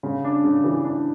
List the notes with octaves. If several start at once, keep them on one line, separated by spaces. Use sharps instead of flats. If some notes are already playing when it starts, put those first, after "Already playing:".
C#3
D4
C#3
E3
D4